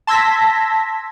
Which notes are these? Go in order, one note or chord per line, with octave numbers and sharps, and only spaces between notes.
A5 C6 E6 G#6 A#6 B6